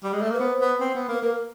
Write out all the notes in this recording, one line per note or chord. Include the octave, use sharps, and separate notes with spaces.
G3
G#3
A3
A#3 B4
B3 C5
B3
C4
B3
A#3
B4
A#3 A#4